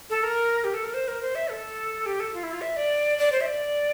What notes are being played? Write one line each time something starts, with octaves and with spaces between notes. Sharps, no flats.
A4
A#4
G4
A4
A#4
C5
A#4
C5
E5
A4
G4
A4
F4
E4
F4
E5
D5
D5
C5
E5
D5